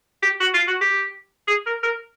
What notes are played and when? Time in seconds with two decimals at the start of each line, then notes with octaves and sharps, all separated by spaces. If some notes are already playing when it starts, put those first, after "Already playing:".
0.23 G4
0.40 F#4
0.54 F4
0.68 F#4
0.81 G4
1.48 G#4
1.66 A#4
1.83 A#4